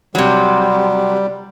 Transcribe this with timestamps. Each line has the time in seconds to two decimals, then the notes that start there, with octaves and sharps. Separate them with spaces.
0.15 C3 F#3 G3